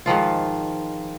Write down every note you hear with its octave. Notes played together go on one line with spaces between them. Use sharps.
G#2 D#3 F3 F4